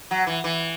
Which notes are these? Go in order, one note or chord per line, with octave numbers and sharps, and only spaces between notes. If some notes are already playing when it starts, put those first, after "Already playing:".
F#3
E3
E3